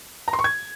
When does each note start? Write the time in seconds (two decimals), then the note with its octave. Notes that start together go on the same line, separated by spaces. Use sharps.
0.28 A#5
0.33 C6
0.39 C#6
0.44 G#6